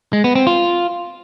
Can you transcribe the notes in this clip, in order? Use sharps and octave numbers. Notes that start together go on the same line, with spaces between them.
G#3
B3
C4
F4